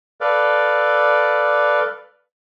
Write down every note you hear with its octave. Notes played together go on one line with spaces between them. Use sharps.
A4 B4 D5 F5